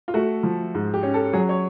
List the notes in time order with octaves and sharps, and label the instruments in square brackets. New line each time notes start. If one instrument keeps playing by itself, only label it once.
[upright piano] F4
[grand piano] A3 [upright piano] F#4
[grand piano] F3
G#2
[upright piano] G4
[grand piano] C#4
[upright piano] A4
[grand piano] F#3 [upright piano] G#4
[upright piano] C#5